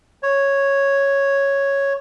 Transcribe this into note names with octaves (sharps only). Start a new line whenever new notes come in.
C#5